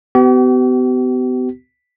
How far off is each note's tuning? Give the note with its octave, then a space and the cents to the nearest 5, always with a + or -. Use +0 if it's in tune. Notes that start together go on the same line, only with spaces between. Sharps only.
B3 +35 G4 -45